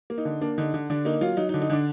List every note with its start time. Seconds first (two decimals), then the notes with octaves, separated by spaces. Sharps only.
0.10 A#3
0.18 D#4
0.25 D3
0.41 A#3 D4
0.58 D3 D#4
0.74 D3
0.90 D3 D4
1.05 A#3 D#4
1.21 F#3 F4
1.37 F#3 D#4
1.49 D#4
1.54 D3
1.62 D#4
1.70 D3 D4